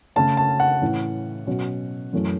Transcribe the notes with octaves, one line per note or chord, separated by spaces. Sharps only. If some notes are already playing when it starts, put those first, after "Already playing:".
C#3 A3 C#4 A5
A5
F#5
A2 E3 C#4
B2 F#3 C#4
F#2 E3 A3 C#4